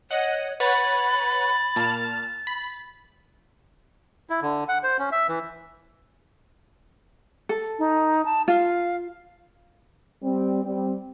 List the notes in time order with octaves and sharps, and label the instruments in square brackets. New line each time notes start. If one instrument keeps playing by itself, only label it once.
[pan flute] C#5 [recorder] D#5 [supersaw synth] F#5
[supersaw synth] B4 C#5 F#5 [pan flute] B5 [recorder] A6
[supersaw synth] A#2 A5 F6
B5
[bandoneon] E4
D3
F#5
C5
C#4
E5
E3
[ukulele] A4
[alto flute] D#4
A5
[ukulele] F4 [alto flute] F5
[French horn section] G3 C4
G3 C4